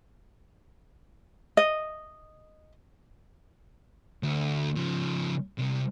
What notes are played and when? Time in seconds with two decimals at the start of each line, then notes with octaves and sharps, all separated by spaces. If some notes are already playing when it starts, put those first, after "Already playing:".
1.57 D#5
4.23 D2
4.76 C#3 F3
5.58 C2 C3